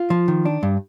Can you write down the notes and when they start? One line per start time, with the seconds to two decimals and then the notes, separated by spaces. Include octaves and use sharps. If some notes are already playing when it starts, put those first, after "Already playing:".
Already playing: F4
0.10 F3
0.28 D#3
0.45 D4
0.63 G2